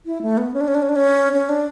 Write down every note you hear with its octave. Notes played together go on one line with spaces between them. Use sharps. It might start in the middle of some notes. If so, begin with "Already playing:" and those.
E4
A3
B3
C#4
D4
C#4
D4
C#4
D4
C#4
C#4
D4